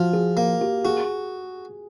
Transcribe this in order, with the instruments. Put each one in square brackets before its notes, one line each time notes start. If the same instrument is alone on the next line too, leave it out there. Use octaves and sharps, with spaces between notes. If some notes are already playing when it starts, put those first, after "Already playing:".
Already playing: [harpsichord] F3 [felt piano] F4 F#4
[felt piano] G#4
[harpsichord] A#3
[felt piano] G4
[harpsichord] F#4 [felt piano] G#4